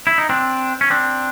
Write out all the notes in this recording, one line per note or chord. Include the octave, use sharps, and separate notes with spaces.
E4
D#4
C4 D4
C#4
C4 D4